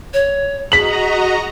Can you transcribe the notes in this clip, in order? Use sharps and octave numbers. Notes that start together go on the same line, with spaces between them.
C#5
F#4 G#4 D#5 A#5 B6 F#7